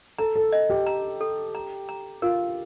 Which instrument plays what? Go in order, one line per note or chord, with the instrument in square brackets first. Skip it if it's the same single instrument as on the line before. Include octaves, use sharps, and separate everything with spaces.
[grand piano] A4 [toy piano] A#5
[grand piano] A4
[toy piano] D#5
[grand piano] G4
[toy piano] A#5
A4
A#5
A#5
[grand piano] F4 [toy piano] A#4